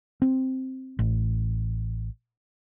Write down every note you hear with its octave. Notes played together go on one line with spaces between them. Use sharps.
C4
A1